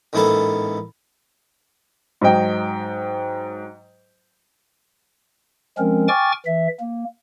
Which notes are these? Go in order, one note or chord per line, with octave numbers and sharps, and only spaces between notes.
A1 G#2 A#3 B3 A4 A5
G#2 F#3 D#5 G5
F3 G#3 C4 C#4 A#4
G5 G#5 C#6 D6 F6 A6
E3 E5
A#3